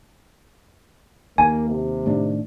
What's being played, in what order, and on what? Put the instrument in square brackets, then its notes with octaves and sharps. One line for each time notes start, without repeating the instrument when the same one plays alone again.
[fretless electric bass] D#2 [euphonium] A#3 [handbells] G#5
[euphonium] C3
[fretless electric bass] A2 D#3 D4